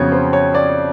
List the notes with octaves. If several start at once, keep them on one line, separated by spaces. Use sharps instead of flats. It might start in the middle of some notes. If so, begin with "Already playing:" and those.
Already playing: F2 C#3 F#3 B3 C#5
C5
C#5
D5